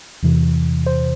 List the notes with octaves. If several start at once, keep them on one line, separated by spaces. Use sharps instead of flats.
E2 C3 E3
C5